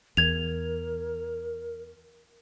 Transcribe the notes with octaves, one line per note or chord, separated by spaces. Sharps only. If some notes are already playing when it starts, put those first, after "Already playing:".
E2 A#4 G#6 F7